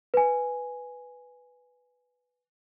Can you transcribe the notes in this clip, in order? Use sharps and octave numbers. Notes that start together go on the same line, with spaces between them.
B4 G#5